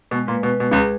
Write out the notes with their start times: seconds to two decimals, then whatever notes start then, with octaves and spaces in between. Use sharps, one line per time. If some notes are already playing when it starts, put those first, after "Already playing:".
0.11 B2 G#3
0.27 A#2 B4
0.43 B2 B4
0.60 B2 G#3
0.71 C#2 C#3
0.76 G#4